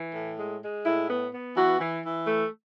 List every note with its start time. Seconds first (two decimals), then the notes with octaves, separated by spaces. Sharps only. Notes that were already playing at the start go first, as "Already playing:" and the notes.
Already playing: E3
0.14 A2
0.38 G#3
0.62 G#3
0.85 A2 E4
1.09 B3
1.32 B3
1.56 E3 F#4
1.79 E3
2.04 E3
2.27 A3